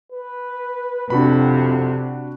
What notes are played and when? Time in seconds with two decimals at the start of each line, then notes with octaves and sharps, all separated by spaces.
0.12 B4
1.10 F2 C3 D4 F#4 B5